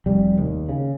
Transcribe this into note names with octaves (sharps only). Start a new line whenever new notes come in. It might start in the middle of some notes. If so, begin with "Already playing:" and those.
F1 G3
D#2
C#3